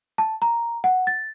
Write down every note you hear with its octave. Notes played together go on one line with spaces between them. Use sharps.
A5
A#5
F#5
A6